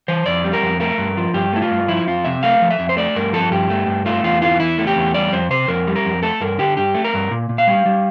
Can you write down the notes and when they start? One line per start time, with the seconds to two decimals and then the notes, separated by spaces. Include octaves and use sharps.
0.08 E3 C5
0.26 F2 D5
0.44 G3
0.53 A#4
0.63 F2
0.80 A3 A#4
0.98 G2
1.17 F3
1.34 G2 G4
1.53 A3 E4
1.62 F4
1.71 G2
1.88 F3 E4
2.08 F2 F4
2.25 C3 E5
2.43 A3 F5
2.62 F3
2.71 E5
2.79 F2
2.89 C5
2.97 A3 D5
3.16 G2 A#4
3.33 F3 A4
3.51 G2 G4
3.70 A3
3.87 G2
4.06 A3 F4
4.24 E2 F4
4.41 E3 F4
4.60 E2 E4
4.78 A3
4.87 G4
4.96 E2
5.14 G3 D5
5.32 F2 C5
5.50 C3 C5
5.68 F2 A#4
5.87 G3
5.96 A#4
6.05 F2
6.23 A3 A4
6.41 G2 A#4
6.58 D3 G4
6.77 G2 G4
6.95 A3
7.05 A#4
7.14 G2
7.31 A#2
7.49 A#2
7.58 F5
7.67 G3
7.86 G3